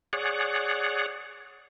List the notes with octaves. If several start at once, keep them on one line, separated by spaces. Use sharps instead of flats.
G#4 C#5 D5 F#5